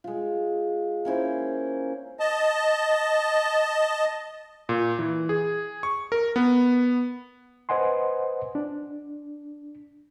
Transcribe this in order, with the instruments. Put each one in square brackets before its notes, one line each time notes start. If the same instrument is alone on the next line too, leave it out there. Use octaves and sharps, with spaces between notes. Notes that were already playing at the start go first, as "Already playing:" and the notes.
[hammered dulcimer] G#3 F4
A#3 C#4 E4 C5
[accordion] D#5 A5
[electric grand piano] A#2
E3
G#4
C#6
A#4
B3
[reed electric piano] B4 C5 D#5 F#5 G#5 C6
D4